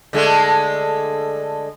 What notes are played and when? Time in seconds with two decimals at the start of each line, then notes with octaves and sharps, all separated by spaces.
0.13 D3 G#3 A3